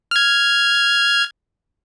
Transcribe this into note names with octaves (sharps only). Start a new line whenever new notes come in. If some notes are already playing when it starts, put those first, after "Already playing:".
F6 G#6